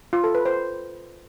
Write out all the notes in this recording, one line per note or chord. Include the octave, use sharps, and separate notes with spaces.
F4
A4
B4
C5